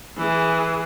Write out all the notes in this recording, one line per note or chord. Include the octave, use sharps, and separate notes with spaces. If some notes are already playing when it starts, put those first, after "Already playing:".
E3 G#4